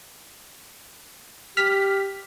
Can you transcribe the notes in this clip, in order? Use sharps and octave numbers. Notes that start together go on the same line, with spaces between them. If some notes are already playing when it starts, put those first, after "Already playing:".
G4 F6 B6